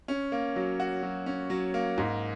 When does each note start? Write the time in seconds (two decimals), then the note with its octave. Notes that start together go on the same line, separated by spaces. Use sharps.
0.08 C#4
0.32 A#3
0.56 F#3
0.80 F#4
1.03 F#3
1.26 C#4
1.50 F#3
1.74 A#3
1.98 G#2